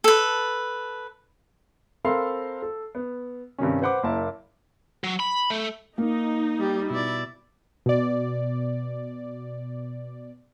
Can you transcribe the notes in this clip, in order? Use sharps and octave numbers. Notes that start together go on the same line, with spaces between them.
A4 B4
C4 A4 A#4 F5 B5 C6
A4
B3
G2 C3 D#3 C#4
B4 C5 F#5 B5 D6
F#1 A#3 E4 A5
F#3
B5
A3
A#3 D#4
G3 G4
B2 E4 D5
B2 D5